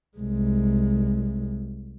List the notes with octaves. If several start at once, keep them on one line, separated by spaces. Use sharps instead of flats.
C2 G#3